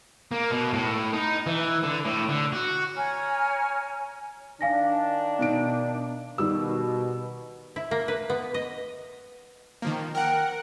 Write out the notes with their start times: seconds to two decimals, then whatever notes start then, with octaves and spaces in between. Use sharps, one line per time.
0.31 A#3
0.51 B2
0.73 A2
1.13 D#4
1.47 E3
1.83 D3
2.05 A2
2.29 D3
2.53 F#4
2.96 C#5 G#5 A#5 F6
4.61 D#3 D4 F5 G#5 A#6
5.39 B2 D#4 D7
6.38 B2 D#3 G3 E6
7.76 E4
7.91 A#3
8.08 B4
8.30 B3
8.54 D#5
9.82 D#3 F3 A#3
10.15 A#4 F#5 G5